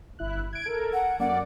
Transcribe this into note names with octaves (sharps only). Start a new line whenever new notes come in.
G1 E4 F#6
G#6 D7
A4 A#4
F#5
F#2 A#3 D5 F#5